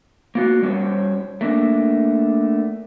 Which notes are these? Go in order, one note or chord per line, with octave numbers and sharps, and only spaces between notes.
A#3 F4 F#4
G3 C#4 G4 C5 C#5
A3 A#3 D4